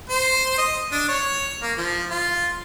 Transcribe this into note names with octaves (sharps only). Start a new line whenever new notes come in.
C5
D#5
D4
C#5
A#3
F3
F4